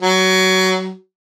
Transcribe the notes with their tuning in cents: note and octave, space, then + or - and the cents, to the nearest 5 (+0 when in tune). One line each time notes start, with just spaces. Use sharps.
F#3 +20